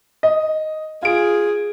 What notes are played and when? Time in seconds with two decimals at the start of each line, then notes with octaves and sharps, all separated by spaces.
0.23 D#5
1.03 F4 G#4 D7